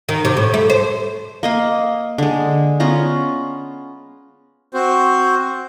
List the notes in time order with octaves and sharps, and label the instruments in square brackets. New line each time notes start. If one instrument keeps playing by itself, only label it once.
[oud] D#3
C3
A2
A3
C5
[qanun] A#3 D#5 F5
D3 G#3
B3 C#4 F4 A#5
[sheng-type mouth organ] C4 F#4 C5